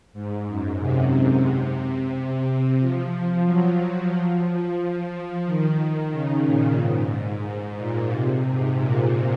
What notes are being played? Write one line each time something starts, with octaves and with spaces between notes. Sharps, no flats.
G#2
F#2
C3
C3
F3
F#3
F3
D#3
C#3
A#2
G#2
G#2
A#2
C3
G#2
A#2